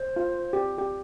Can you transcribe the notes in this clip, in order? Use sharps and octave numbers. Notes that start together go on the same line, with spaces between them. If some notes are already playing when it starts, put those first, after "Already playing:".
Already playing: C5
F4
G4
G4